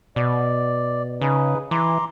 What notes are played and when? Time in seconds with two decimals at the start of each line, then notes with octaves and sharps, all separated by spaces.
0.16 B2 D5
1.21 C#3 D#4 G#4 B4
1.71 E3 A#5 C6 D6